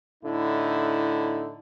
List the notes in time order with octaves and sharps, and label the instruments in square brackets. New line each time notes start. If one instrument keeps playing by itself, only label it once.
[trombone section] A2 D3 D#4 E4